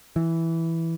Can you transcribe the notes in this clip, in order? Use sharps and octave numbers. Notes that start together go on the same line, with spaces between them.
E3